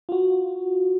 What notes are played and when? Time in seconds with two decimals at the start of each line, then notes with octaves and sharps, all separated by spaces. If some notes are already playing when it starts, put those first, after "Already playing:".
0.09 F4 F#4